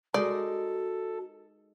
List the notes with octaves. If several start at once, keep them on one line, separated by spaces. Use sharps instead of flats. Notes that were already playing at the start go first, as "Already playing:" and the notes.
G#3 D#4 F#4 A4 A#4 D5